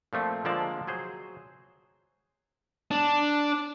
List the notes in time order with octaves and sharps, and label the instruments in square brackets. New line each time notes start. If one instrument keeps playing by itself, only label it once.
[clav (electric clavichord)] A#2 F3 A3 C4
D3 F3 G#3 A#3 D5 A5
F#3 G#4 C5
[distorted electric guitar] D4